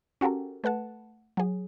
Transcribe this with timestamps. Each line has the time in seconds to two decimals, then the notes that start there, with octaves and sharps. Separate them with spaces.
0.21 C#4 F#4 G4 A4 A#4
0.64 A3 B4 F#5 A5
1.37 F#3 G#4